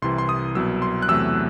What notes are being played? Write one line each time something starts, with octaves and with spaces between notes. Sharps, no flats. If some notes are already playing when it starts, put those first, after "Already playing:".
C2 C3 E3 C6
C6
D#6
C2 B2 F#3 E6
C6
F#6
E2 C3 F#3 A3 E6